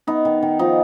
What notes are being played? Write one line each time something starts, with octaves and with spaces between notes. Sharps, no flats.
B3 D#4
D#3
D#3
F3 D#4